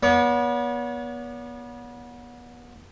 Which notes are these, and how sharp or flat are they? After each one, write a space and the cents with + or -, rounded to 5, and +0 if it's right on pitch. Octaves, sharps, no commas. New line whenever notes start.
B3 -30 C#5 +45